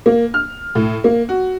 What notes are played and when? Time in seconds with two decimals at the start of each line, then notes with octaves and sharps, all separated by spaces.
0.06 A#3
0.34 F6
0.75 A2
1.04 A#3
1.29 F#4